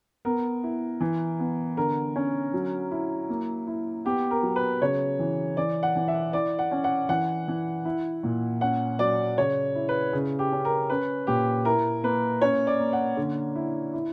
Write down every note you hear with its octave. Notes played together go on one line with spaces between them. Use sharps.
B3 A#4
E4
E3
B3
D3 A#4
C#4
F#3
E4
A#3
E4
B3 G4
A#4
F#3
B4
C#3 C#5
E3
E3 D5
F#5
E3
E5
E4 D5
F#5
C#4
F#5
E3 F#5
E3
E4
A#2
C#4 F#5
F#3 D5
C#3 C#5
E4
B4
C#3
G4
C#4
A#4
C#4 B4
A#2 G4
E4 A#4
A#3 B4
C#4 C#5
D5
A#3
F#5
D3
E4
E4